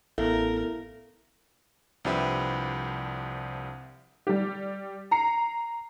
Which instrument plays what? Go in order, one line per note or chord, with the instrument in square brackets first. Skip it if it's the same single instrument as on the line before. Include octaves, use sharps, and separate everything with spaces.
[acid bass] A1 [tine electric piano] B3 A4 [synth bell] E4 E5 F5 [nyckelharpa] A#4
[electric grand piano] C2 F3 D4 G4 B4 E5
[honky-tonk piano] G3 G4
A#5 C7 C#7